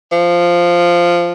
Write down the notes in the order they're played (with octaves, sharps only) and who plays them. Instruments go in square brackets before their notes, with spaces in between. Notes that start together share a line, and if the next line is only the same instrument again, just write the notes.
[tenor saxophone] F3